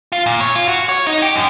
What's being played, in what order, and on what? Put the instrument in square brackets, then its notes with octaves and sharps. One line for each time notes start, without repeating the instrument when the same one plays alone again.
[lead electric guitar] F4
A#2
C#5
F4
F#4
C#5
D#4
G4
F#2